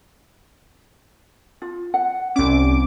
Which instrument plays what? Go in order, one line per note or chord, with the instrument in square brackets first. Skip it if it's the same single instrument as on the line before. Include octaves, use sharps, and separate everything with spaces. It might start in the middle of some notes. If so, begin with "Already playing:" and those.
[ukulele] F4
F#5
[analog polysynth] C2 D6 [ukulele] C#4